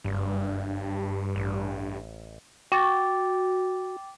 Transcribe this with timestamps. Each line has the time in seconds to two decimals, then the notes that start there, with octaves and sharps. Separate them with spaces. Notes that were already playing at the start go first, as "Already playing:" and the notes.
0.04 F#1 G2
1.36 A1
2.72 F#4 G5 D6 A6